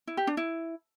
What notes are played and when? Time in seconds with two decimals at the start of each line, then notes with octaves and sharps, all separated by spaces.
0.07 E4
0.17 G4
0.27 D4
0.37 E4